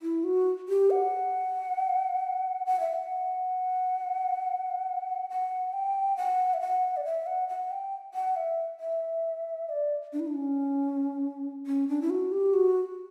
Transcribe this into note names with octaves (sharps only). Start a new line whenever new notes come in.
E4
F#4
G4
F#5
F#5
E5
F#5
F#5
G5
F#5
E5
F#5
D5
E5
F#5
F#5
G5
F#5
E5
E5
D5
D4
E4
D4
C#4
C#4
D4
E4
F#4
G4
F#4